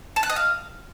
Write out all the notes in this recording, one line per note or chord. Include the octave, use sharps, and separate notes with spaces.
A5
F#6
D#5
F5